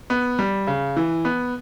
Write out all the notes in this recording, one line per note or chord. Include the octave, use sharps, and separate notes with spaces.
B3
G3
C#3
E3
B3